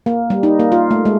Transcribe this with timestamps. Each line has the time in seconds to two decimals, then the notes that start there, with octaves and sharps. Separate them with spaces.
0.06 A#3
0.30 G3
0.43 D#4
0.60 A#3
0.72 F4
0.91 A3
1.05 G#3